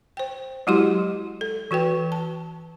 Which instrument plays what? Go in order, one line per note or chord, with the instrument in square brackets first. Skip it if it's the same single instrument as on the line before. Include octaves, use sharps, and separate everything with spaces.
[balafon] C5 G5
F#3 G#3 E4 F#4 G4 C6
A4
E3 F#4 B4 G5
A5